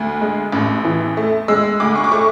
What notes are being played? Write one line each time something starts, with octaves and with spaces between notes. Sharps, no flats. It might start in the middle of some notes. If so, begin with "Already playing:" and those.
Already playing: D2
G#3
A1
E3
A3
G#3 E6
E6
D2 D6
C#6
D6
A3 C#6